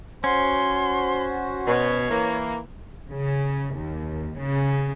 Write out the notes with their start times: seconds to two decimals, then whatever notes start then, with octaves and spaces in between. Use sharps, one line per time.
0.24 C#4 F#4 C5 C6
1.67 B2 C#5
2.09 E3 A#3
3.11 C#3
3.76 D#2
4.39 C#3